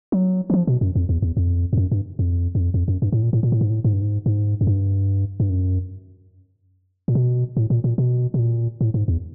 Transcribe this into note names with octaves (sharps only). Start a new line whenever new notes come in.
F#3
E3
F3
B2
F#2
F2
E2
E2
F2
F2
F#2
G2
F2
F#2
F2
F2
F#2
G2
A2
A#2
A2
A#2
A2
G#2
A2
G#2
G2
G#2
G#2
F#2
G2
G2
F#2
A#2
B2
A2
A#2
A#2
B2
B2
A#2
A2
G#2
E2